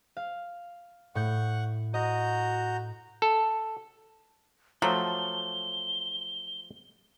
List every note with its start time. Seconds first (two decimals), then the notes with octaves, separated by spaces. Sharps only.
0.17 F5
1.15 A2 F#5 C#6 G6
1.94 F#4 D#5 A#5 G6
3.22 A4
4.82 F3 F#3 A3 G7